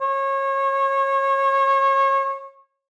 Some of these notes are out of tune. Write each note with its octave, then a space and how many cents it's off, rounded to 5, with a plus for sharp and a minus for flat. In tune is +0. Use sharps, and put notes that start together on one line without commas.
C#5 -30